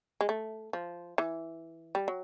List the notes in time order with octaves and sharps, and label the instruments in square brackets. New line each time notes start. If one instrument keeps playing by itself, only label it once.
[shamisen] G#3
A3
F3
E3
G3
F#3